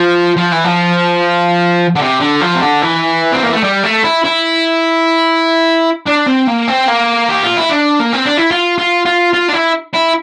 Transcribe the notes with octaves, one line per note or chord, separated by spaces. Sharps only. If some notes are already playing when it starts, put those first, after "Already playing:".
Already playing: F3
F3
E3
F3
D3
C3
D3
F3
C3
D3
E3
C4
A#3
A3
G3
A3
E4
E4
D4
C4
A#3
C4
A#3
G4
F4
E4
D4
A#3
C4
D4
E4
F4
F4
F4
F4
D4
E4
E4